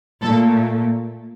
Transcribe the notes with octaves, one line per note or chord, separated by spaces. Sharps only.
A#2 A3 A4